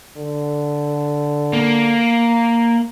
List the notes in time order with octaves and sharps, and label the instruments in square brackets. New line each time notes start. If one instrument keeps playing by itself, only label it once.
[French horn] D3
[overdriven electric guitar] A#3